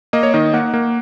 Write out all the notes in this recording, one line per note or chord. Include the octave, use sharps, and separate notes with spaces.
A#3 D#5
C#5
D#3 D#5
A#3 F#5
A#3